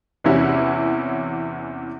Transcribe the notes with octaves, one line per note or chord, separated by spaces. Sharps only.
E2 C3 E3 C#4 E4 F#4